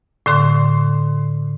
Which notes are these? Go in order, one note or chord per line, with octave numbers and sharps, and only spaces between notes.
A2 D3 C6